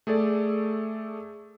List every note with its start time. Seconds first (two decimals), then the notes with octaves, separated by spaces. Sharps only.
0.07 A3 G#4 A4 D5